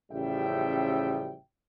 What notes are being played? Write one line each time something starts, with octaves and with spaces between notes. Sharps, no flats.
A1 C#3 F3 G3 E5 G5